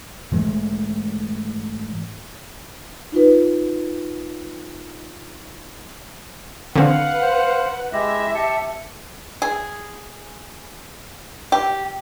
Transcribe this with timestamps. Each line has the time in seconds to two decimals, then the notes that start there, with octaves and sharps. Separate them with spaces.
0.32 G#2 E3 G#3 A3
3.12 D#4 F4 B4
6.76 D3 C4 B4 F5 F#5
7.22 C5
7.93 G#3 E4 G4 E5 A#6
8.35 G4 A5 C#7
9.42 G#4
11.52 G4